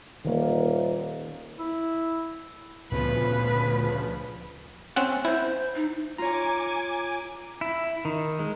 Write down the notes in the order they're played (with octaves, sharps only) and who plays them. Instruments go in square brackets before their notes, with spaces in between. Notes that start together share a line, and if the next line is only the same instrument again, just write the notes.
[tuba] D#1 [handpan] D#3 A#3
[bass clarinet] E4
[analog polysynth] D2 C#3 F3 [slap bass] A#2 B3 [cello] B4
[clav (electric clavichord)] C4 C#4 F#5
[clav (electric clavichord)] E4 [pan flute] C5
[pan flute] D#4
[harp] F4 C#5 [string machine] G#5 D6 [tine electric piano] A#5
[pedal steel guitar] E4
D#3
G#3